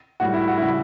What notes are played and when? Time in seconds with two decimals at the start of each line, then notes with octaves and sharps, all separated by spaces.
0.20 A2 G3 F#4
0.33 E4
0.48 F#4
0.58 C#3 G3 E4